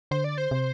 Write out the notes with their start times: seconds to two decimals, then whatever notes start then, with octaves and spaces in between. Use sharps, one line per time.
0.11 D3 C5
0.24 D5
0.38 C5
0.51 C3